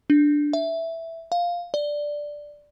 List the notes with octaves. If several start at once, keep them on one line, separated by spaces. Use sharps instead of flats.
D4
E5
F5
D5